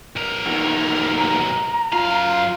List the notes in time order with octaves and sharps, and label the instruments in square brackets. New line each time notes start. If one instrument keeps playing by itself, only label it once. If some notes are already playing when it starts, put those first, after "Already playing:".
[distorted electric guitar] B1 A#4
[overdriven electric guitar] E2 D#3
[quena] A#5
[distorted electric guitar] F#2 F5 [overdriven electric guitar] F4